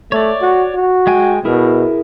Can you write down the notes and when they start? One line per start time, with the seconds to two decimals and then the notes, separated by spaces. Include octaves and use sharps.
0.12 A3 C#5 D5
0.42 F#4
0.75 F#4
1.07 G#3 G5 G#5
1.45 B2 E4 G#4 A#4